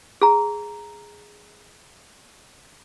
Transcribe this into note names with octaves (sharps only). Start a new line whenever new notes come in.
G#4 A#5